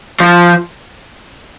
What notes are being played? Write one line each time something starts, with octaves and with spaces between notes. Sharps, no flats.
F3